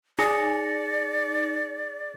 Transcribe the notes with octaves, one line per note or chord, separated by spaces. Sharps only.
D#4 G#4 D5 A#6 C#7